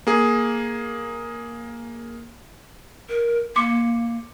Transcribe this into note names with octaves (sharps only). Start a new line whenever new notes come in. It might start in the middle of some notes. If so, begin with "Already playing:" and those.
A#3 G#4
A#4
A#3 C6 D6 C#7